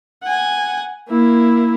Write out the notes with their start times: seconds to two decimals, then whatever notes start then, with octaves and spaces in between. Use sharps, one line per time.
0.23 F#5 G#5
1.08 A#3 E4